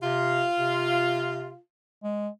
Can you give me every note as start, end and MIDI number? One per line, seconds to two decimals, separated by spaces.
0.02 0.45 48
0.02 1.59 65
0.58 1.52 48
2.04 2.28 56